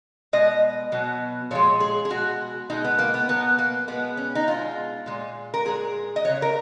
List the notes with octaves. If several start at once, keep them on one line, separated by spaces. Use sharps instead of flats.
B2 G#3 D#5
B2 F#3
A#2 F3 G#3 C#5
G#4
G#4
B2 G#3 F#4
B2 G#3 D#4
B3
A#3
B3
B2 F#3 B3
A#3
B2 G#3 B3
C#4
D#4
B2 G#3 F4
A#2 G#3
A#4
A#2 G#3 G#4
D#5
C#3 F#3 C#5
A#4